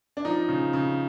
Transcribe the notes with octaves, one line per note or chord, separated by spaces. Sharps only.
D4
F3 D#4
C#3
C#3